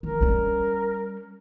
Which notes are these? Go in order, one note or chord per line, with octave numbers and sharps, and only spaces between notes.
D#3 A#4
G3 C#4